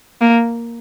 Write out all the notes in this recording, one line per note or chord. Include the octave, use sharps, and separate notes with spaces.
A#3